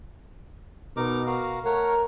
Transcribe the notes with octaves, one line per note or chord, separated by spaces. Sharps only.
B2 D#4 A#4 D6
F#4 A#4 F5
A3 A#4 C#5 F#5